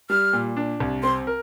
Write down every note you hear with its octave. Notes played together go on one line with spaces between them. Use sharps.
G3 F6
A#2
D4
C2
C4 C6
A#4